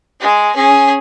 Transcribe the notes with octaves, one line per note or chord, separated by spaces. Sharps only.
G#3 G#4
C#4 G#4